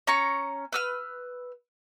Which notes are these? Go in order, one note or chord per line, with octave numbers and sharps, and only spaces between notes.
C#4 A#5 C#6
B4 E6 F6